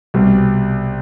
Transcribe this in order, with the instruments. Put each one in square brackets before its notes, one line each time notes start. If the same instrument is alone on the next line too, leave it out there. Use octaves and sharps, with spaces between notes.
[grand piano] C2 B2 G3